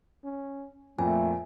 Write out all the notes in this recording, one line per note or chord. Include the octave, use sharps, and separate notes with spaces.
C#4
F2 A#2 A3 G#5